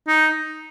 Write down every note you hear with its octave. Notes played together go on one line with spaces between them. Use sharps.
D#4